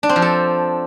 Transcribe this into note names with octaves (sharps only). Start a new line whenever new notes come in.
D4
C4
F3
A4